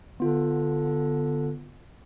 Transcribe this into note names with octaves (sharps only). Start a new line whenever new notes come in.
D3 B3 F4